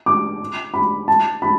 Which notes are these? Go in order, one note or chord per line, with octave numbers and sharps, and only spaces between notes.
D6
B5
A5
B5